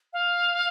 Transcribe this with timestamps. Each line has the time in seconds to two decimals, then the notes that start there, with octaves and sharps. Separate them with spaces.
0.13 F5